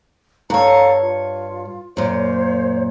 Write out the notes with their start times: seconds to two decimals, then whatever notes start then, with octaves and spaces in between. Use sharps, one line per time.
0.50 G2 A4 C#5 F5 A#5
1.01 F4
1.97 F#2 A#2 C5 C#5